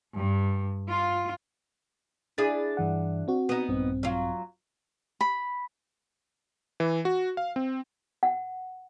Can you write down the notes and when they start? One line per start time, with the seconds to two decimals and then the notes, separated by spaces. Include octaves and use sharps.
0.15 G2
0.89 F4
2.38 D4 E4 G#4 A6
2.77 G2 E3 F#5
3.28 C4 F#4
3.49 B3 D#4
3.68 A#1 G2 C4
4.03 F#3 F4
5.21 B5
6.80 E3
7.05 F#4
7.37 F5
7.56 C4
8.23 F#5